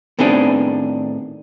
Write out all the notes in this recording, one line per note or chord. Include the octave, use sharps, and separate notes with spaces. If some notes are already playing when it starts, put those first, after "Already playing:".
A2 D#3 B3 C4 D4 G#4